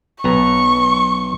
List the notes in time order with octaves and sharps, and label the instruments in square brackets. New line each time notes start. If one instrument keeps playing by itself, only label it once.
[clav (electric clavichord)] B1 B3 A#5 [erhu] C#6